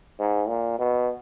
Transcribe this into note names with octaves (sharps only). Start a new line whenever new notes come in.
G#2
A#2
B2